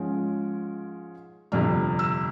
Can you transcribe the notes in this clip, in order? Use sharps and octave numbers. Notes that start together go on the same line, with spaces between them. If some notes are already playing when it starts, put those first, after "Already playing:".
Already playing: G#2 F3 G#3 C#4
G1 F2 C3 F6
E6